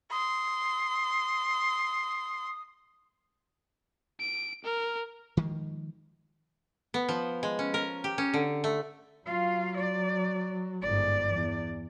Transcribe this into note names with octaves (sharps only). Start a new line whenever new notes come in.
C6 D#6
D7
A#4
D#3 F3 G#3
B3
F3
G#3
C#4
A#4
G4
C#4
D3
A3
F#3 F4 F5
D5
G1 G#2 D5
E2